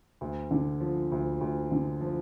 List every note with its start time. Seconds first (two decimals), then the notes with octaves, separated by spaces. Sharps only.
0.21 D2
0.51 D3
0.80 F3
1.12 D2
1.41 D2
1.71 D3
2.01 F3